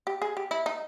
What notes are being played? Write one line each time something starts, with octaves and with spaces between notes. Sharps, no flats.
G4
G#4
G4
E4
D#4